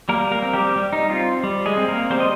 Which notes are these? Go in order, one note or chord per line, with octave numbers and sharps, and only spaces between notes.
G3 A#3 A#4
A#3 A#4
C4
G3 G4
G3
D#4
C4 F4
G3
G#3 G#4
C4
A#3 A#4
G3 C4 C5
D#5